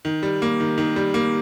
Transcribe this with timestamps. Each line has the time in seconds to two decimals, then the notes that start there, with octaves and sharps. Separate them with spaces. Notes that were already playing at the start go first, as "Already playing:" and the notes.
0.05 D#3
0.23 G3
0.42 A#3
0.60 D#3
0.78 D#3
0.96 G3
1.14 A#3